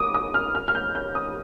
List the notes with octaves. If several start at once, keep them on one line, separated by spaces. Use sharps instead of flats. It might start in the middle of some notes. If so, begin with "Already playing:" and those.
Already playing: D6 D#6
D#6
F6
F6
F6
G6
G6
D#6